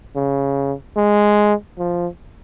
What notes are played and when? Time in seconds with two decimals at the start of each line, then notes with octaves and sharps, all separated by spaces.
0.16 C#3
0.97 G#3
1.78 F3